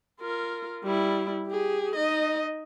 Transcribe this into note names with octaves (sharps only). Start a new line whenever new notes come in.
F4 A#4
G3 E4
G4 G#4
D#4 D#5